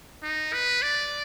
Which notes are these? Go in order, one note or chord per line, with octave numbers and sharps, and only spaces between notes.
D#4
B4
D5